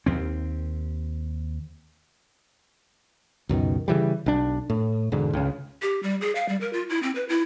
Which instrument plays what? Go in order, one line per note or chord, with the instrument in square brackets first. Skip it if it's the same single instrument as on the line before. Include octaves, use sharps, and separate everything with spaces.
[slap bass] D#2 C4
[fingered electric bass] C#2 F#2 B2 D#3
C#3 E3 G3
B1 D4
A2
E1 G#2 D3
C#2 C#3
[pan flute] G4
G3
G#4
F5
G3
A#4
F4
E4
C4
B4
E4